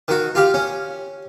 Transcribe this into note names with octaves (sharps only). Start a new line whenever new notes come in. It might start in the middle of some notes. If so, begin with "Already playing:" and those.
D#3 F#4
F4 G4 F5
C#4